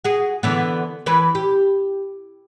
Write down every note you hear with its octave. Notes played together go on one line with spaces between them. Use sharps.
F#4 G#4
D3 E3 B3
E3 B4
G4